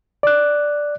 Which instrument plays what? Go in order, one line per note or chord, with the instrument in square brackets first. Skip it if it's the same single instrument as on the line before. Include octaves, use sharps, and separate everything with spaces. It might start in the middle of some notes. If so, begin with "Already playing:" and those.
[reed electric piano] D5 F#6